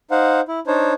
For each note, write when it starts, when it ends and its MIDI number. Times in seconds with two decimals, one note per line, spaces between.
0.11 0.41 63
0.11 0.41 72
0.11 0.41 77
0.11 0.41 78
0.48 0.60 64
0.67 0.93 62
0.67 0.93 63
0.67 0.93 72
0.67 0.93 73